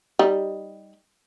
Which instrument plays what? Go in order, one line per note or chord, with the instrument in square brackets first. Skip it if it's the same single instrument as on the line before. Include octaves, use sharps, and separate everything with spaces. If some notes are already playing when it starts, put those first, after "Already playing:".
[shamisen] G3 D#4